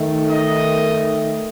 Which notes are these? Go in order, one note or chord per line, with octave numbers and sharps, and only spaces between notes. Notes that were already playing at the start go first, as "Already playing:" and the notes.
Already playing: D#3 A3 D#4
D#5